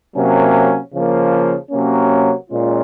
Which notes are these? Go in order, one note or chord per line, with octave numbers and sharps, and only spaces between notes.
C3 F#3 A#3 C#4
C#3 F3 A#3
C3 F#3 A#3 C#4
A#2 G#3 C#4 F4